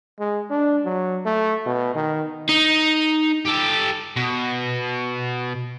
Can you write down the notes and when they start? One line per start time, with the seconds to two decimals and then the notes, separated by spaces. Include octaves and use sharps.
0.19 G#3
0.50 D4
0.85 F#3
1.26 A3
1.66 B2
1.95 D#3
2.49 D#4
3.45 G4 A4
4.17 B2